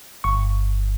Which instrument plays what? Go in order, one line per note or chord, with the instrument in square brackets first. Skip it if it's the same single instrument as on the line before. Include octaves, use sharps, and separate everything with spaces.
[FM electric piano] G1 C#6